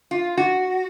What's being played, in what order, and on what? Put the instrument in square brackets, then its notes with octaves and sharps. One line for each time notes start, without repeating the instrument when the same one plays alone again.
[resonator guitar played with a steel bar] F4
F#4